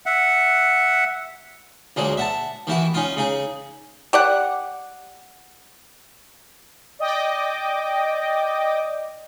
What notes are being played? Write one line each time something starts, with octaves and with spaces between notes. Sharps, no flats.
E5 F#5
D2 A#2 F#3 G#3 G#4
E5 F#5 A5
D#3 E3 E4 F#4
C#4 D#4 F4
C#3 D#4 G#4
G4 D5 F#5
D5 D#5 G5 D6